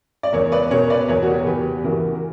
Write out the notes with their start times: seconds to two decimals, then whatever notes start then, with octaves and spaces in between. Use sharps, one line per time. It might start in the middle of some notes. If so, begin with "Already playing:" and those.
0.23 D5
0.33 E2 A#4 C#5
0.52 B4 D5
0.71 B2 A#4 C#5
0.90 B4 D5
1.08 E2 A#4 C#5
1.23 F#4
1.31 G4
1.39 A#4
1.46 E2 G4 B4
1.78 G4
1.83 E3 F#4 A#4
2.15 A#4